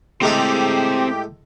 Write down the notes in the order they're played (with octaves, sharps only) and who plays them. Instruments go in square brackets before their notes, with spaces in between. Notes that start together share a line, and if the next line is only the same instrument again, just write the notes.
[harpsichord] A2 G#3 A4 [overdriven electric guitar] C4 A#5 [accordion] G4